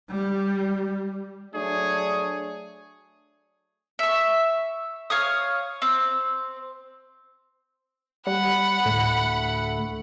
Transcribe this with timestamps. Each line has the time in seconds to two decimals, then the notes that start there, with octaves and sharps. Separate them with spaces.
0.10 G3
1.54 F#3 A3 D4 G#4 C#5
3.99 E5 C#6
5.10 C#5 F5 D#6
5.82 C4
8.27 G3 F#5 B5
8.86 D2 A2 A3